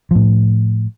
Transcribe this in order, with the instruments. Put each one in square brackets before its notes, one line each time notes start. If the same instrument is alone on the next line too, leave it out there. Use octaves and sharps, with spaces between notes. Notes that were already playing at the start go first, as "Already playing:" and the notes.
[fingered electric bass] A2 F3